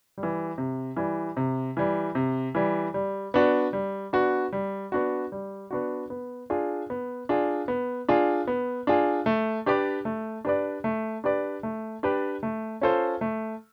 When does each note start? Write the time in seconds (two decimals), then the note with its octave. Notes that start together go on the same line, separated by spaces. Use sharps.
0.18 G3
0.23 E3
0.58 C3
0.97 E3 G3
1.37 C3
1.77 E3 G3
2.15 C3
2.55 E3 G3
2.94 G3
3.34 B3 D4 F#4
3.73 G3
4.13 B3 D4 F#4
4.53 G3
4.92 B3 D4 F#4
5.32 G3
5.71 B3 D4 F#4
6.10 B3
6.50 D4 F4 G#4
6.90 B3
7.29 D4 F4 G#4
7.68 B3
8.09 D4 F4 G#4
8.47 B3
8.87 D4 F4 G#4
9.26 A3
9.66 D4 G4 B4 D5
10.05 A3
10.45 D4 G4 B4 D5
10.84 A3
11.24 D4 G4 B4 D5
11.63 A3
12.03 D4 G4 B4 D5
12.43 A3
12.81 C#4 F4 A4 C5
13.21 A3